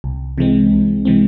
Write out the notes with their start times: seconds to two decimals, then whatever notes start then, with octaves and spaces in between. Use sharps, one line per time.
0.04 C2
0.38 C3 E3 G#3 C4
0.71 C2
1.05 C3 E3 G#3 C4